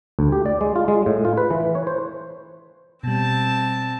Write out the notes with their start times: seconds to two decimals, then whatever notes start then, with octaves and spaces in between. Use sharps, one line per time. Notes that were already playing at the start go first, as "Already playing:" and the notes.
0.19 D2
0.32 G4
0.46 D5
0.61 G#3
0.76 F4
0.88 G#3
1.06 A2
1.25 F4
1.37 B4
1.51 E3
1.75 C#5
1.87 C5
3.03 B2 G3 C4 A5